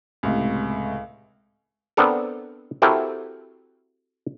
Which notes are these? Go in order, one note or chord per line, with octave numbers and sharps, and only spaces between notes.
C#2 A2 C3
B3 C4 D4 A4 A#4
C4 E4 F#4 G4 A4 A#4